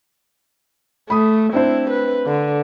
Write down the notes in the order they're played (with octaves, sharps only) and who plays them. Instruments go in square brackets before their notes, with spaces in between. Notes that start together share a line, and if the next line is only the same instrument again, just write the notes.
[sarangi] A3 [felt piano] B5 D#6
[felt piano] C4 D4 C5 [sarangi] E4
[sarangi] B4
D3